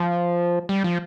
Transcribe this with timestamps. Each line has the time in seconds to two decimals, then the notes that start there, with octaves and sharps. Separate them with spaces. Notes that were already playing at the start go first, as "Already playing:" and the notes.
Already playing: F3
0.69 G3
0.84 F3